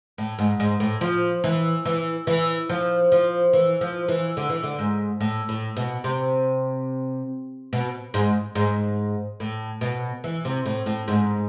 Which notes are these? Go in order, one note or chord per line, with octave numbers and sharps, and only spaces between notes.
A2
G#2
G#2
A2
F3
E3
E3
E3
F3
F3
E3
F3
E3
D3
E3
D3
G#2
A2
A2
B2
C3
B2
G#2
G#2
A2
B2
E3
C3
A2
A2
G#2